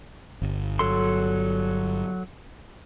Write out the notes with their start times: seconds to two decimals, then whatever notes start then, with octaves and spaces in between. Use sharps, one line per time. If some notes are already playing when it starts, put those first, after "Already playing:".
0.42 G1
0.79 F#3 A4 C6